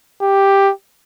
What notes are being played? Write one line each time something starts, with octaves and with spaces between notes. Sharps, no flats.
G4